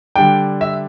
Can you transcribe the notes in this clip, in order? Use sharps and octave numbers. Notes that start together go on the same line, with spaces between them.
D3 G3 D4 G5
E5